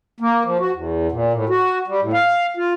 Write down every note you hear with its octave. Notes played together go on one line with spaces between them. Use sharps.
A#3
F3
F#4
E2
A#2
A2
F#4
G3
A2
F5
F4